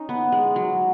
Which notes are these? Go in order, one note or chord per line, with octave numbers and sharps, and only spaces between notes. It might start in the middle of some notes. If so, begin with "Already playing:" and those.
Already playing: C#4 D#4
B3
G#3
F#3